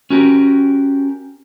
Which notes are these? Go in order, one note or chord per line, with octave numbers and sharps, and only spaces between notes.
C#4 F#4 G4 A#4